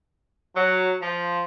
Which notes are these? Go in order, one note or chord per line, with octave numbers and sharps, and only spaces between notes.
F#3
F3